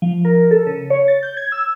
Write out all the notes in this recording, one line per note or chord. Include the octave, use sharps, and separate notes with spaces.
F3
A#4
A4
C#3
C#5
A6
G6
G#6
E6